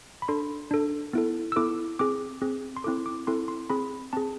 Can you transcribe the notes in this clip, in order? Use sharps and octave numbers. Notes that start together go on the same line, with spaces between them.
B5
D4 A4 C6
D4 A4
B3 E4 A4
E6
B3 E4 A4 D6
C4 G#4 D6
C4 G#4
C6
C4 E4 A4 D6
D6
C4 E4 A4 C6
C6
C4 G#4 B5
C4 G#4 A5